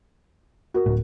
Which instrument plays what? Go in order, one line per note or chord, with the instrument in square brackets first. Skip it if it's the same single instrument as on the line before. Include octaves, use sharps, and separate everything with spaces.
[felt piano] F#4 A#4
[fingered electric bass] D1 A2